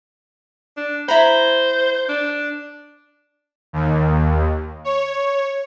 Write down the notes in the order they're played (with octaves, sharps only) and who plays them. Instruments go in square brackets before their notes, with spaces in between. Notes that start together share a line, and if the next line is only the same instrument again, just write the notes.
[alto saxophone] D4
[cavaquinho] E4 A#5 B5 [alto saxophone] C5
[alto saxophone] D4
[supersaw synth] D#2
C#5